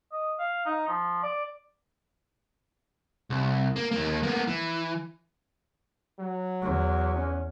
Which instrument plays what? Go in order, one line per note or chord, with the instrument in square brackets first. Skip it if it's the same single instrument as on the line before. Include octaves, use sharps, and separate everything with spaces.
[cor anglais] D#5
F5
D#4
F3
D5
[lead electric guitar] C2
A#3
D#2 A#3
A#3 B3
E3
[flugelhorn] F#3
[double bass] E2
[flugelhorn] C#4